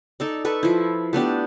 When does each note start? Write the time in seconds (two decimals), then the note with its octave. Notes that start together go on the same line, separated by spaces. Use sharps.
0.20 D#4 A4 D5
0.45 A4 B4 C#6
0.63 F3 E4
1.13 A3 B3 D4 G4